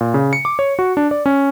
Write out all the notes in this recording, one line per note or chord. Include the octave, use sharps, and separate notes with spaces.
A#2
C#3
C#7
D6
C#5
F#4
D4
D5
C#4